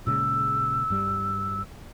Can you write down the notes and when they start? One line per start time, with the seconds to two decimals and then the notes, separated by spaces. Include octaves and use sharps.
0.07 A#2 C#3 G#3 E6
0.90 G2 G3